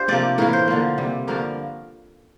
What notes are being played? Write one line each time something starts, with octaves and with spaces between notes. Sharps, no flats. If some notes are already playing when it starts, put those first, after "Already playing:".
Already playing: D4 F4 G4 C5
C3 F3 A#3 D5
A2 E3 A#3 A#4
C5
D3 F3 A#3
C3 G3 A#3
G2 D3 F3 A#3 A#4